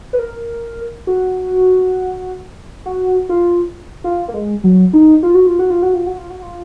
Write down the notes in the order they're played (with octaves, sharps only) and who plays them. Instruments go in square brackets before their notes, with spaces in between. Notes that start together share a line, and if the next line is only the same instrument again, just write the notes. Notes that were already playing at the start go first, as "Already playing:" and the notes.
[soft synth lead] B4
A#4
F#4
F#4
F4
F4
A#3
G#3
F#3
D#4
F4
F#4
F4
F#4
F4
F#4
F4
F#4
F4
F#4
F4